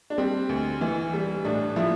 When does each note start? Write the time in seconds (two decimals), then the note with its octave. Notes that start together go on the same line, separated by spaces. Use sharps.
0.10 D4
0.18 G3 C4
0.49 D2
0.81 E3
1.13 G3
1.45 A2 D4
1.76 F3 E4